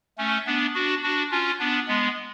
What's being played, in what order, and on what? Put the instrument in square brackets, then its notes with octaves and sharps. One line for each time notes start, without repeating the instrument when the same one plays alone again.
[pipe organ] A3 C#4
B3 D4
D4 F#4
D4 F#4
C#4 F4
B3 D4
G#3 B3